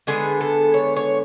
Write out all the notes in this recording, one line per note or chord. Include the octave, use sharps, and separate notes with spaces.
D3 G#3 B3 G#4
A4
C#5
C#5